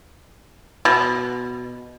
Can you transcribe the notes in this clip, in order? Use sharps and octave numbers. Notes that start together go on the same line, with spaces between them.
B2